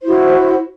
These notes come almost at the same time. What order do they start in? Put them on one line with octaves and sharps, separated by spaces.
C5 E4 F#4